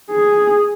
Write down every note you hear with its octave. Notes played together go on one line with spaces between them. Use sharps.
G#4